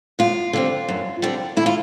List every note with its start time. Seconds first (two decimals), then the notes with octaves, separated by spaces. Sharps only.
0.19 F#2 F4
0.53 D3 G3 C4
0.88 F#2
1.22 D3 G3 C4
1.57 D3 E4
1.66 F4